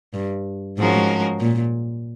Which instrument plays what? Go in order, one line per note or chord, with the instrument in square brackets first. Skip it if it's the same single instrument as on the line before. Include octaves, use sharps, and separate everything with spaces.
[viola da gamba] G2
[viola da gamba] G#2 [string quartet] F3 G#3 C#4 F#4 A#4
[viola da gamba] A#2